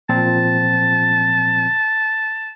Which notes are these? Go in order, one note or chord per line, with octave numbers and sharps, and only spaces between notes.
A#2 F3 C4 A5